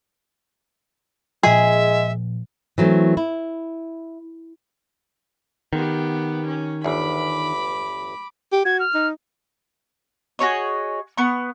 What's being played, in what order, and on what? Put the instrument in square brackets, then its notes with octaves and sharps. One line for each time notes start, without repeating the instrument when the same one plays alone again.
[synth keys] A#2 F3 [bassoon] G#3 [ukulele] G#4 [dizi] E5
[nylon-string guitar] E3 F#3 A3 C4
E4
[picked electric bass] D#3 [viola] B3 G4
[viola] C#4
[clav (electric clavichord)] G1 E2 [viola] B5 D6
[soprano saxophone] G4
[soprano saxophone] F#4 [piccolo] G#6
[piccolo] F6
[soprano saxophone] D#4
[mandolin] F#4 G#4 C#5 D#5
B3 C#6